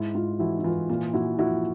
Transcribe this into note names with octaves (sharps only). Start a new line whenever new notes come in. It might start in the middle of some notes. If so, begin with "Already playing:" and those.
Already playing: G#2 E4
G#2 F4
E3 E4 F#4
E4
E3 F4
A#2 F4
A#2 E4 F#4
F3 E4 F#4